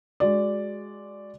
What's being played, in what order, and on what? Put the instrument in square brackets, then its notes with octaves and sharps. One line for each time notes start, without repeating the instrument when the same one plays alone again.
[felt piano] G#3 F#4 D5